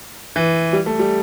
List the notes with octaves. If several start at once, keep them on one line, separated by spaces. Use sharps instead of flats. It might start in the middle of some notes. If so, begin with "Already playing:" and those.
E3
G3
A3
G3